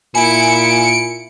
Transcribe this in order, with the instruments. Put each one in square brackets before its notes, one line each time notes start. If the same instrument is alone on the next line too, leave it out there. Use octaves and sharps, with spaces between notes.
[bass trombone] A#2 [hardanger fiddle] E4 [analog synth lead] G#5 [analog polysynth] C#7 D7